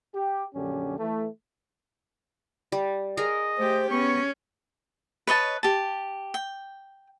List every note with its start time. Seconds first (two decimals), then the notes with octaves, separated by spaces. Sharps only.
0.14 G4
0.55 A#1 F#2 D3 C#4 G4
0.98 E3 A3
2.72 G3
3.17 G#4 A#4 D#5
3.58 A3 G4 C5
3.91 B3 C#4 C#6
5.27 B4 C#5 D#5 A5
5.63 G4 A5
6.34 G5